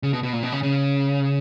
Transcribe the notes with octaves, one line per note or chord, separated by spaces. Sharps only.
C#3
B2
B2
A#2
B2
C#3
C#3